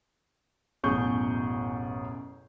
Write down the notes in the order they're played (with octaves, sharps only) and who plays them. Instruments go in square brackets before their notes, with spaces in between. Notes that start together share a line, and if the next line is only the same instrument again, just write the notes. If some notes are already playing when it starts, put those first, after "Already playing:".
[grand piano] A1 F#2 B2 G#4 C#6 G6